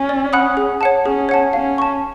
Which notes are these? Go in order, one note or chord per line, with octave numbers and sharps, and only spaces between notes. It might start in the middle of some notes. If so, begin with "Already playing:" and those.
Already playing: C#4
D5
F#5 B5 D#6 F#6
G#4
C#5 F#5 A5
C#4 G#4
C#5 F#5 A5
C#4 F5
A5 C#6